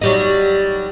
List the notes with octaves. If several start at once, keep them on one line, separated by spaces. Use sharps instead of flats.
F#3 G3 D#4